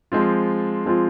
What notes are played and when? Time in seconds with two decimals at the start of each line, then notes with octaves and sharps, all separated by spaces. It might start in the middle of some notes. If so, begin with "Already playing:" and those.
0.12 F3 G#3 C4 F4
0.85 F3 G#3 C4 F4